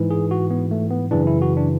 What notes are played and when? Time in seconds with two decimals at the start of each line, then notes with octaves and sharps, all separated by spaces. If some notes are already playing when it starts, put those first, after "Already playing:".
Already playing: G#2 E3
0.11 G#4
0.31 F#4
0.51 B3
0.71 A3
0.91 B3
1.11 F#2 C#3 E3 D4
1.27 E4
1.42 F#4
1.57 D4